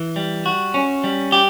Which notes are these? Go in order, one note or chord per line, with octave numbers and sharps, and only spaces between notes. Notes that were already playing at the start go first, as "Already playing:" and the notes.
Already playing: E3
G3
F#4
C#4
G3
G4